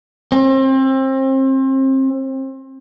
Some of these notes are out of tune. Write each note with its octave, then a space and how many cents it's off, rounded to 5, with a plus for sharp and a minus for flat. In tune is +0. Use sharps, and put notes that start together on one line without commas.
C4 +30